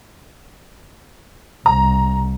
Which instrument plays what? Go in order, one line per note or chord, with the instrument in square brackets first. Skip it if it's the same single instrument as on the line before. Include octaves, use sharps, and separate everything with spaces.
[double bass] C2 [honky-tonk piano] A#5